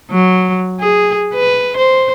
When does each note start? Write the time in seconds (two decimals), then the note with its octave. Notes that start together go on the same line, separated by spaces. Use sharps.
0.11 F#3
0.80 G#4
1.34 B4
1.77 C5